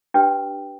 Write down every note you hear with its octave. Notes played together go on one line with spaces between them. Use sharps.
D4 G4 B4 G5